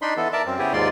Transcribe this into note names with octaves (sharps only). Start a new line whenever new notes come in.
D4 D#4 B5 C6
E3 B3 A4
A#4 D5 E5 A5
F#2 C4
C#3 B3 E4 G4 G#4
D#2 G#2 F4 D5 C6